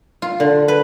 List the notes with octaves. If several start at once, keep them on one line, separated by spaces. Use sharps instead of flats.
F4
D3
B4